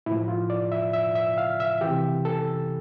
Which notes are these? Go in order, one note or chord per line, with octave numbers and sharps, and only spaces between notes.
A2 F3 E4
F4
D5
E5
E5
E5
F5
E5
C3 E3 G4
A4